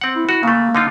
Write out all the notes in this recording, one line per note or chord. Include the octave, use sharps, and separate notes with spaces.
C4 F#5
E4
F#4
C#3 A3 A#3
D3 D#4 F4